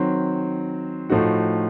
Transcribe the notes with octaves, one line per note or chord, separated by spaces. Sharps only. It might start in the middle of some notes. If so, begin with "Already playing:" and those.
Already playing: D#3 F#3 C4
A2 F3 A3 D#4 F#4